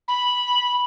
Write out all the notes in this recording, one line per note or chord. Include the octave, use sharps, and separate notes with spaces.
B5